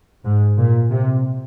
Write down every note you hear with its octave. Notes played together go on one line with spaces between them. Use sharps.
G#2
A#2
C3